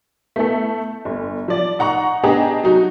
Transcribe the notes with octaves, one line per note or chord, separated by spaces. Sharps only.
A3 B3 E4 A4
G1
F3 D5
D#4 F#5 A#5 C#6
B3 D4 G4 G#4 D#5 A#5
F#3 D#4 F#4